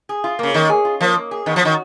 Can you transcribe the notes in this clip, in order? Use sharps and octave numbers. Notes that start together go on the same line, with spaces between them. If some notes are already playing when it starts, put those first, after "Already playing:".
G#4
F4
C#3 A#3
D#3 A#3
G#4
F4
F3 A#3
A#3
G#4
D#3 B3
F3
D#3 F#4